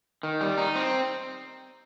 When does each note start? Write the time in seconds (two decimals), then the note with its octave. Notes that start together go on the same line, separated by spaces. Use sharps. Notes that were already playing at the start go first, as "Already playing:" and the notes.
0.23 D#3
0.41 G3
0.58 D#4
0.76 C4